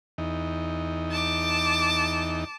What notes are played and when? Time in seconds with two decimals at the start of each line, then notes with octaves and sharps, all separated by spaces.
0.18 E2 D#4
1.11 A5 D6